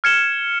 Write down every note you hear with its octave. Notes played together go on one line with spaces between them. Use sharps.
F6 G#6 C#7 E7 G7